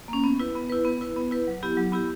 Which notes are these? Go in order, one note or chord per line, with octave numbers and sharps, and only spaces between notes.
A#3 C#4
B3
E4 B4
B3
E4 B4
B3
E4 B4
B3
E4 B4
F#3
B3 E4 G4
F#3
B3 E4 G4